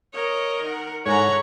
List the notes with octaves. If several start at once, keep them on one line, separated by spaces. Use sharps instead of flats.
A#4 C#5 D#5
D#3 F#5
G#2 E4 A4 C#5 F#5 G#5 A#5